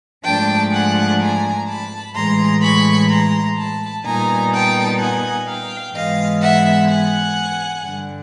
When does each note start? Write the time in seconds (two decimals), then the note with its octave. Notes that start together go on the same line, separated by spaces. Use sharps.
0.24 G#2 F3 A3 D4 G5 A5
0.72 F#5 G#5
1.19 G#5 A#5
1.67 A5 B5
2.14 A2 E3 G#3 A#5 C6
2.62 B5 C#6
3.09 A#5 C6
3.57 A5 B5
4.04 A#2 G3 B3 D#4 G#5 A#5
4.52 G5 A5
4.99 F#5 G#5
5.47 F5 G5
5.94 G#2 E3 G#3 B3 D#5 F5
6.41 E5 F#5
6.89 F#5 G#5
7.84 G2 D3 G3